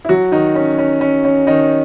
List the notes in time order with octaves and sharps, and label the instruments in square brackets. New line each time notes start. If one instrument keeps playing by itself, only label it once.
[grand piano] E4
F#3 F#4
D#3 D#4
C#4
C#4
C#4
C#4
D#3 D#4